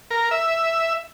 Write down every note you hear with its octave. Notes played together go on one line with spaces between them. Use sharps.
A#4
E5